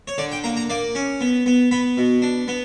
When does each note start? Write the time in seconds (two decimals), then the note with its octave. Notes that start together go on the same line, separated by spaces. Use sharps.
0.08 C#5
0.18 D3 D5
0.32 G5
0.44 A#3 A#5
0.57 A#5
0.70 A#3 D5
0.95 C#4
1.21 B3
1.46 B3
1.71 B3 B5
1.97 B2
2.22 D4
2.48 B3